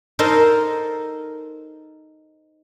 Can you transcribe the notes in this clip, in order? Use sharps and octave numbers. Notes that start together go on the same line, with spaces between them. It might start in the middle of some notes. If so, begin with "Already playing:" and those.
D#4 A4 A#4 C5 D#5